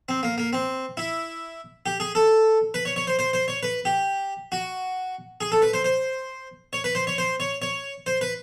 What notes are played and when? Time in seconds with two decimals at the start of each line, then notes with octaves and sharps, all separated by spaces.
0.09 C4
0.23 A#3
0.38 A#3
0.53 C4
0.97 E4
1.86 G4
2.00 G#4
2.15 A4
2.74 B4
2.85 C#5
2.96 C#5
3.07 C5
3.19 C5
3.33 C5
3.48 C#5
3.63 B4
3.85 G4
4.52 F#4
5.41 G#4
5.52 A4
5.62 B4
5.73 C5
5.84 C5
6.73 C#5
6.84 B4
6.95 C5
7.07 C#5
7.18 C5
7.40 C#5
7.62 C#5
8.06 C5
8.21 B4